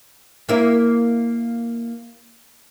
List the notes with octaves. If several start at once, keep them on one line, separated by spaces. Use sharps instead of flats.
A#3 E4 A#4